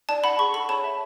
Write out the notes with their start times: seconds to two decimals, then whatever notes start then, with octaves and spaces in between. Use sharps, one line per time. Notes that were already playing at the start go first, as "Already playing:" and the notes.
0.09 D5 A5
0.24 F#5 B5
0.39 G#4 C#6
0.54 A4 B5
0.69 C#5 A5
0.84 E5